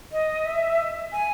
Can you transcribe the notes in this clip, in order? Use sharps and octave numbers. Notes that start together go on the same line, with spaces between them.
D#5
E5
G#5